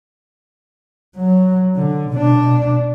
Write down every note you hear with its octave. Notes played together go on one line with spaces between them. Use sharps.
F#3
D3
B2 D4